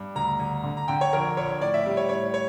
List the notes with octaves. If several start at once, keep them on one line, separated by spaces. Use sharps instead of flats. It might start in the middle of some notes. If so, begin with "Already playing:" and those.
Already playing: G2
D2 A#5
D2
D3
A#5
D3 G5
C#5
A#1 A#4
A#1 C#5
A2 D5
E5
G3
C#5
A2 C#5
C#5